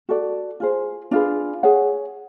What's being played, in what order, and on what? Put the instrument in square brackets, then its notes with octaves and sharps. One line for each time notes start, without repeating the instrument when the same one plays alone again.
[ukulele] F#4 A4 D5
F4 G#4 C5
D4 F4 G#4 B4
G#4 C#5 F#5